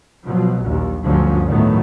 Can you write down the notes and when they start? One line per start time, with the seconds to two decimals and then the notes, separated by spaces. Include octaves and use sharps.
0.24 B2 F3 F#3
0.62 A#1 D#2
1.05 D2 G2 D3 F3 F#3 C#4
1.50 A2 D#3 F#3 A3 B3